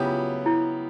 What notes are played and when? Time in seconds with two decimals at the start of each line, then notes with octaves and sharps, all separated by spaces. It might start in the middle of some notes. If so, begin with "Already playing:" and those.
Already playing: C#3 F#3 B3 E4 F4 G4
0.46 E4